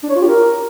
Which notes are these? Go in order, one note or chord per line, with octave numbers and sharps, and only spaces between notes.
D4
C#5
F4
G4
A#4